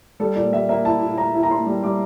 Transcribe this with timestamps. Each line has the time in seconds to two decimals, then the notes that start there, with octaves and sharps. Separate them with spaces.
0.20 G3 A4
0.36 A#2 D5
0.52 G3 E5
0.69 A#3 E5
0.85 E4 A5
1.02 A#2
1.17 A#3 A#5
1.34 E4
1.43 A#5
1.51 A#3 C6
1.66 G3
1.83 G3 D6